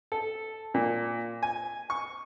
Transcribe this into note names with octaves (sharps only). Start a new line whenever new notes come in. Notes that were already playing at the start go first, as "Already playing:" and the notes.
A4
A#2
G#5
C#6